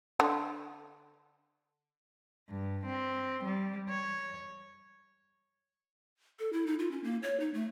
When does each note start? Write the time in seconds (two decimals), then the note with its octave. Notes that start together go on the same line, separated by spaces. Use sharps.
0.20 D3
2.49 G2
2.85 C4
3.44 G3
3.90 C#5
6.39 A4
6.53 E4
6.67 D#4
6.79 F4
6.91 C#4
7.04 A#3
7.23 C#5
7.40 D#4
7.54 A3